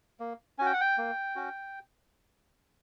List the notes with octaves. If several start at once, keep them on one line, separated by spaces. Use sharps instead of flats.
A#3
C#4 F#4 G5 G#5
F#5
G5
A#3
C#4 F#4